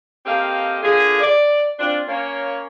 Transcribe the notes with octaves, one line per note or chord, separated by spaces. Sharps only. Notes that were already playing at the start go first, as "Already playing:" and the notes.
A#3 C4 G4 A4 D#5 F5
D3 A#3 F4 G#4
D5
C4 D4 F4
A#3 C#4 C#5